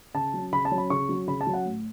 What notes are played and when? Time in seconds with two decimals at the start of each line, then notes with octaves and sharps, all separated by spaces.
0.14 C#3 A5
0.34 F#3 C#4
0.53 C#3 B5
0.65 A5
0.71 F#3 C#4
0.78 B5
0.90 C#3 C#6
1.09 F#3 C#4
1.28 C#3 B5
1.41 A5
1.47 F#3 C#4
1.54 F#5
1.65 A2